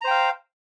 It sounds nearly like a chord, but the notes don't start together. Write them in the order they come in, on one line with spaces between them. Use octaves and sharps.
A#5 C5 G5 F5